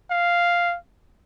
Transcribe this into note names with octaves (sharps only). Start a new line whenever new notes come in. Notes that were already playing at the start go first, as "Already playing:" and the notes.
F5